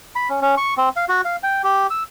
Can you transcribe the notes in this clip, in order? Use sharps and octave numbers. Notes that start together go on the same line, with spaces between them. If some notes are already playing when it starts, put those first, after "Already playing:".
B5
C#4
C#4
C#6
C4
F5
F#4
F5
G5
G4
E6